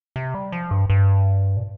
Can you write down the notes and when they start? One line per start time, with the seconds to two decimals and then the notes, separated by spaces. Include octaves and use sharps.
0.16 C3
0.34 G3
0.52 F3
0.71 G2
0.90 G2
1.57 A#2